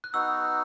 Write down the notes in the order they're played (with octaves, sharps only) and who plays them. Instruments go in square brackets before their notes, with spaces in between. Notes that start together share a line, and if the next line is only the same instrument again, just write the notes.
[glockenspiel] F#6
[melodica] B3 D#4 F#4 [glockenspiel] E6